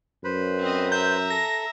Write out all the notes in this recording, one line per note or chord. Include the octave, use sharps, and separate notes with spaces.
F#2 B4 C5 B5
C4 D#5
E5 A#5 G6
A4 A#6